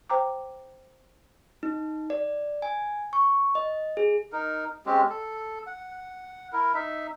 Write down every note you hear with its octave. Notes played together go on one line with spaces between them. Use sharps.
C5 G5 A#5 D6
D#4
D5
G#5
C#6
D#5
G#4
D#4 A#4
G#3 C4 C#4 G4
A4
F#5
E4 A#4
D#4 E5